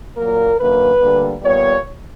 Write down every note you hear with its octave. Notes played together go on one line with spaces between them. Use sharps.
A#2 F#3 A#3 A#4
F#2 D3 A#3 B4
D2 D3 G3 A#3
A#2 G3 B3 C#5